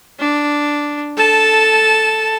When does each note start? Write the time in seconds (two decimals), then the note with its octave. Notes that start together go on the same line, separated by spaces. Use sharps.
0.20 D4
1.17 A4 A5